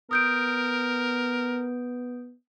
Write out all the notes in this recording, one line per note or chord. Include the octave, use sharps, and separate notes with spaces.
B3 A#4 D#6 G6 D7